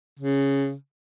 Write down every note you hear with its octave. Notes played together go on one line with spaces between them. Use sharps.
C#3